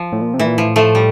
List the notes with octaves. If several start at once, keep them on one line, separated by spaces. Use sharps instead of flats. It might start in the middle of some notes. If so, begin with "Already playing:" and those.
Already playing: F3
A2
A#2
C3
A2 E3
A#2
A2 F3
F3 A3
G3